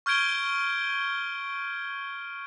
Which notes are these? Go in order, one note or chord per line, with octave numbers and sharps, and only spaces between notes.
C#6 F6 G6 G#6 D7 G7